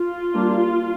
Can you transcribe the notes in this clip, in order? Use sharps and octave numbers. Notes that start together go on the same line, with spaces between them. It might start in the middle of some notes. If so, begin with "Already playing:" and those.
Already playing: F4
G3 A#3 D4